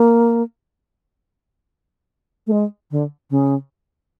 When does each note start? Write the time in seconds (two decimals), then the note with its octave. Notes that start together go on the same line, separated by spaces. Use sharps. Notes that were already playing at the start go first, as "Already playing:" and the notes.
Already playing: A#3
2.47 A3
2.52 G#3
2.91 D3
3.31 C#3